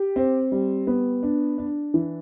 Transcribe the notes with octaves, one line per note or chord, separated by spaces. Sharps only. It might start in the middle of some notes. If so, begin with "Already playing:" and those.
Already playing: G4
C4
G3
B3
D4
D4
E3